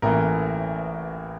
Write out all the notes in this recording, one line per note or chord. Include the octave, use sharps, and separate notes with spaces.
A1 A2 E3 A#3 A#4